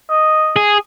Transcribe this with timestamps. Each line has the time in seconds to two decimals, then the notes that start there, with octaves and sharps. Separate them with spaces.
0.10 D#5
0.56 G#4